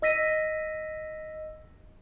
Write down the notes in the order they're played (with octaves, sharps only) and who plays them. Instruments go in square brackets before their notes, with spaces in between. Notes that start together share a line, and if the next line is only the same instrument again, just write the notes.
[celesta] D#5 E6 A#6 B6 D#7